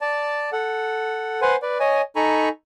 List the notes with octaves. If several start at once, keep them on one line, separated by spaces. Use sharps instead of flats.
D5 A5
A4 F#5
B4 C5 F#5 G#5 C6
B4 D5
C#5 D#5 G#5
D#4 A4 G#5 A#5 B5 C#6